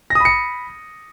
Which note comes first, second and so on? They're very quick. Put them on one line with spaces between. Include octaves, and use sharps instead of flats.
A#6 D#6 B5 C#7